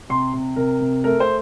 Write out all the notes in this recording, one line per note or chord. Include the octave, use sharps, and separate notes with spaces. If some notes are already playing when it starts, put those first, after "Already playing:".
C3 C6
C3
C3 A#4
C3
A3 A#4
C5